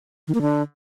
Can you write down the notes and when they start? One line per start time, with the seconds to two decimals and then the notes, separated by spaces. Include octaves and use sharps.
0.28 D#3
0.34 A#3
0.41 D3